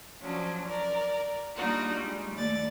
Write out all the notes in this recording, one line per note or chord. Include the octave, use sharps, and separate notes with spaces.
F3 F#3 C#4 D4
A#4 D5
G3 A#3 D4 D#4 F4 F#4
G3 G#3
D#2 A3 D5 A6